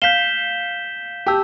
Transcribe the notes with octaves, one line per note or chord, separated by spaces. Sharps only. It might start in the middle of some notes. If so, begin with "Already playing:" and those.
F5 G6 B6 E7 G7
G4 A5 E6